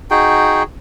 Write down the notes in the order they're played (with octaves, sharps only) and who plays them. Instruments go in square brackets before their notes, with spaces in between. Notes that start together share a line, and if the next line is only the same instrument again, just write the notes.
[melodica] D#4 F#4 G#4 G5